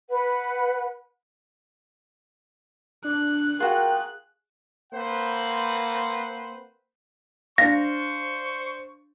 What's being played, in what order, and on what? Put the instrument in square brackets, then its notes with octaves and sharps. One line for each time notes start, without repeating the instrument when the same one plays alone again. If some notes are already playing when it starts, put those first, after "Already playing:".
[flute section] B4 F#5
[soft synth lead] D4 [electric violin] F#6
[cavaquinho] F4 F#4 [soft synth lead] G#4 [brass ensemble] A#4 G5
[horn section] A#3 C4 B4 C5 F#5
[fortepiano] D4 F5 [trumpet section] C5 C#6 [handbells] A#6